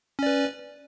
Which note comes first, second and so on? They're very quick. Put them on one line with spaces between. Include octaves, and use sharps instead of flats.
C#4 D5 B4